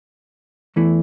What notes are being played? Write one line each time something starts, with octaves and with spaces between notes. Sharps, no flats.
E2 E3 A3 E4